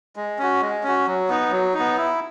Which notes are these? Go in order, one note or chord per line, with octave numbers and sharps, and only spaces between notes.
G#3
C#4 F#4
G#3
C#4 F#4
F#3
B3 D#4
F#3
D#4
B3
E4